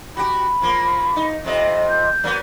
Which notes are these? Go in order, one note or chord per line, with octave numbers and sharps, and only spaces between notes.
F#4 G4 B5
F3 A#3
D#4
F2 C3 D#5
G6
F#3 A#3 B3